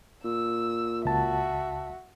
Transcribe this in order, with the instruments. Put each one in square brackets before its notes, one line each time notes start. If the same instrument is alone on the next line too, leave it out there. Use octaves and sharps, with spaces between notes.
[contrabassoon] A#2 [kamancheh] E6
[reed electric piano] C#2 A5 [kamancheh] F#4 E5